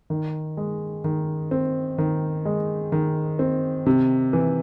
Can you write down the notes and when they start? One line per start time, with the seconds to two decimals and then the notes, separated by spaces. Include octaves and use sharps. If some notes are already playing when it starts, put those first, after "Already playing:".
0.10 D#3
0.57 G#3
1.04 D#3
1.51 C4
1.98 D#3
2.45 G#3
2.92 D#3
3.39 C4
3.86 C3
4.33 E3